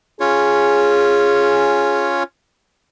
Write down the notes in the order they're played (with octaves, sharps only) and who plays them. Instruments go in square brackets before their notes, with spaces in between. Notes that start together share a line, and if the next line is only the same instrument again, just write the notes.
[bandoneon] C#4 F4 C#5 [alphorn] G#4